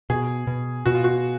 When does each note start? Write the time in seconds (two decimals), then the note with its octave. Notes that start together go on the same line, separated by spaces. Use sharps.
0.10 B2 G#4
0.47 B2
0.86 B2 F#4
0.95 F4
1.04 F#4